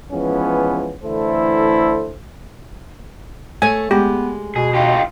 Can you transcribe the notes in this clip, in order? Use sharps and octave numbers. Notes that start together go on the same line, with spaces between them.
E3 F3 G#3 B3 C#4
D3 E3 A3 E4 A4 C5
A3 C#5 G#5
G#3 B3 G4
B2 G#4
D#4 F4 G4